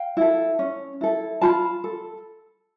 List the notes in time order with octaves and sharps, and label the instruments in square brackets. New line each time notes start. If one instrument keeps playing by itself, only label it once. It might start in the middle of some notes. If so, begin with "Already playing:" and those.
Already playing: [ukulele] F5 G5
E4 A4
C#4
E4 A4
F4 A5 B5
A4